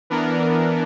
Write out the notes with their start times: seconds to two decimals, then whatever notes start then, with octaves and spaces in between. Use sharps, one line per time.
0.10 E3 B3 D4 A#4